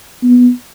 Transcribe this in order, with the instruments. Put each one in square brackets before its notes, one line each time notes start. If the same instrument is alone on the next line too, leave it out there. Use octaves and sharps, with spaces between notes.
[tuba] B3